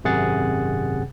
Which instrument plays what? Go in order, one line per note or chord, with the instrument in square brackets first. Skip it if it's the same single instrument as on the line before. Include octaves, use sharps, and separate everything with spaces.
[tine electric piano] G#1 F#2 C3 G#4 F#5 A6